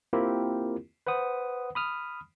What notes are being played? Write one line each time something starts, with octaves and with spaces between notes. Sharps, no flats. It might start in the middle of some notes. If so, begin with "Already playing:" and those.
A#3 C4 E4 F4 G4 A#4
B4 C5 F#5 D#6
B5 D#6 F6